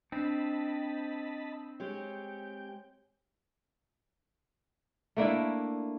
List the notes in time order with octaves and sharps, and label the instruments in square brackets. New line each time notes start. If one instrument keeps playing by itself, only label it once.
[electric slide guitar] C4 [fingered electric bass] D4 [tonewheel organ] D#5 A5 B5
[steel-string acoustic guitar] G#3 G4 C#5 [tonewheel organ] G5
[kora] A3 A#3 D4 E4